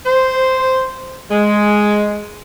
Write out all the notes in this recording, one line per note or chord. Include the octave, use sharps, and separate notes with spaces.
C5
G#3